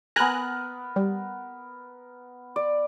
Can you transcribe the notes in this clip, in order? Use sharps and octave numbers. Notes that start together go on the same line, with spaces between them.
B3 A#4 G#5 A#5 F#6
G3
D5